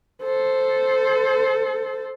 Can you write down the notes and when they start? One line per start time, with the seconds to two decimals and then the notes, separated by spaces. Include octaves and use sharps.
0.23 A4 C5